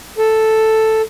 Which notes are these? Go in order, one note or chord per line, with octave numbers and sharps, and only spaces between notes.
A4